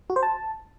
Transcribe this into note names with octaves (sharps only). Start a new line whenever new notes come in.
F#4
C5
A5